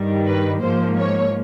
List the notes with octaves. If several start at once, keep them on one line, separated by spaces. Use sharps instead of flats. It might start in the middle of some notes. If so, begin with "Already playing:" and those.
Already playing: G2 D#3 G3
B4
G#2 F3 A#3 C5
C#5